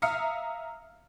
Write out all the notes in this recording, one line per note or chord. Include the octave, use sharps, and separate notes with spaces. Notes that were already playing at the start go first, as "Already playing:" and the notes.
E5 F5 A#5 D#6 F6 C#7